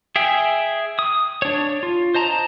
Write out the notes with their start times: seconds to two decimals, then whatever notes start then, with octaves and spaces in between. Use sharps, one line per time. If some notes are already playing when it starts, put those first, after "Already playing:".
0.16 G#4 E5 G5
0.99 D#6
1.42 D4 C#5
1.83 F4
2.14 C5 D#5 A5 A#5